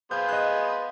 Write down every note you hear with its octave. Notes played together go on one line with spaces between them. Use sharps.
B3 G#4 C5 F5 G6
D#5 F#6